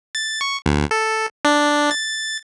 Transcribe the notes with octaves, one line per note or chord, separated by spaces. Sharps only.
A6
C#6
D2
A4
D4
A6